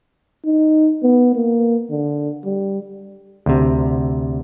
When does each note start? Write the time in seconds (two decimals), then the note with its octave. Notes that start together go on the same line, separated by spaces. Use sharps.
0.45 D#4
1.03 B3
1.35 A#3
1.91 D3
2.45 G3
3.46 D2 C3